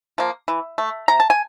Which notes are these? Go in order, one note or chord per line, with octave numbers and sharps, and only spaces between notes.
F3 A#3
E3
A3
C3 A#5
A5
G#5